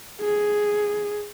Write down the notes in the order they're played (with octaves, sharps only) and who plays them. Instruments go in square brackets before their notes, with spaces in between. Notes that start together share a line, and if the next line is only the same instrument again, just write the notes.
[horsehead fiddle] G#4